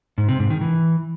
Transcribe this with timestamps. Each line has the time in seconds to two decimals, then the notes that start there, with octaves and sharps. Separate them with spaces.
0.18 G#2
0.29 C3
0.39 G#2
0.50 D#3
0.61 E3